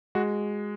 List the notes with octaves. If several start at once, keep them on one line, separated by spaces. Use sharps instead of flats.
G#3 F#4